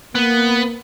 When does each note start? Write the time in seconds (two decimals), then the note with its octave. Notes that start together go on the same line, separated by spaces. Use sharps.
0.15 A#3 B3